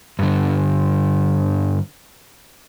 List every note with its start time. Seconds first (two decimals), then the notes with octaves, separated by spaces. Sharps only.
0.19 G2 D3